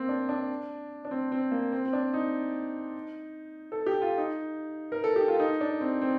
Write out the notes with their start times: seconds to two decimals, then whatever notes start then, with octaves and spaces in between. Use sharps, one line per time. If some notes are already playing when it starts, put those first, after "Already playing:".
Already playing: A#3 C4
0.09 D4
0.29 D4
1.05 D4
1.11 C4
1.32 C4
1.52 A#3
1.72 C4
1.85 C4
1.93 D4
2.14 D#4
3.72 A4
3.86 G4
4.02 F4
4.18 D#4
4.92 A#4
5.04 A4
5.16 G4
5.28 F4
5.39 D#4
5.61 D4
5.81 C4
6.02 C4